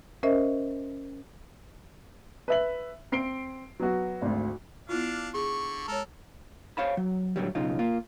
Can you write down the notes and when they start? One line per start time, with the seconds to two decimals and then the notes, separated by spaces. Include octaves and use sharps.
0.23 C#4 A#4 C5 D#5 E5
2.48 B4 E5 F#7
3.12 C4 C7 D7 G7
3.80 F#3 B3 F#4
4.22 G#1 D2
4.89 B3 D4 E4 F4 F5
5.34 D3 G#4 C#6
5.88 G#3 A4 A#4 C#5
6.77 C5 C#5 F5 A5 B5
6.97 F#3
7.36 A2 D3 F#3 G3
7.55 B1 C#3 D#4 F4
7.79 A#3 F4